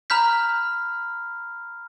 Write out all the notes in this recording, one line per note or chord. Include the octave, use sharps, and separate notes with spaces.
A#5 B5 F6 G6 B6